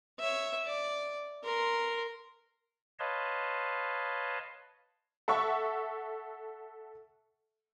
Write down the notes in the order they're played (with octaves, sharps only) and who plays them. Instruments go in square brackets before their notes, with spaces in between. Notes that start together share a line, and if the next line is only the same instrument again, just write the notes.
[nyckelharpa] C#5 E5
D5
A#4 C6
[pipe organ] B4 C#5 D#5 F5 A5 C6
[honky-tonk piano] A4 E5 F#5 C#6